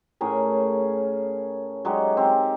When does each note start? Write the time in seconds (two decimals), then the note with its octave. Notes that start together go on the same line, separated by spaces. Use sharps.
0.21 A2 C#4 G#4 A#4
1.85 F#3 G#3 D#4 G4
2.17 C4 G4